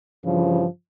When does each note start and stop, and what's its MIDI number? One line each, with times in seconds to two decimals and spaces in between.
0.25 0.66 43
0.25 0.66 49
0.25 0.66 52
0.25 0.66 53